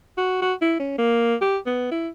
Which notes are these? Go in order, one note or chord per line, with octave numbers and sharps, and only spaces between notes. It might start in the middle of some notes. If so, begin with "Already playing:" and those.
F#4
F#4
E4
C#4
A#3
G4
B3
E4